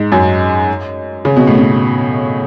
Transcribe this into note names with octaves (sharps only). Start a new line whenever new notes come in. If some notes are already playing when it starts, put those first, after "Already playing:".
Already playing: G#2
F#2
C#3
B2
A2
B2